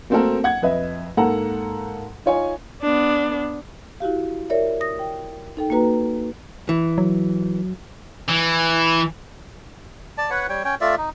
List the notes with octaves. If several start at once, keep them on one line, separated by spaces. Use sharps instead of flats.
A3 A#3 C4 F#4 A4 A#4
F#5 G#6
F2 B4 D#5 E5
G#2 A#3 A4 F#5 A#5
D#4 F4 C#5 G#5
B3 D4
E4 F#4 G4 F5
A#4 C#5 D5 E5
D#6 A#6
G5
D#4 A4 G5
A#3 D#4 F#4 B4 A#5
E3
F#3
E3
D5 A5
B4 C#5 F#5
G3 C#5 G5
C#4 C#5 G5
A3 F4 D5 E5
D#4